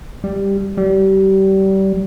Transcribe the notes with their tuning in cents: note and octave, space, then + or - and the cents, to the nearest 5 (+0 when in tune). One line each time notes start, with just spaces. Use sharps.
G3 +5
G3 -30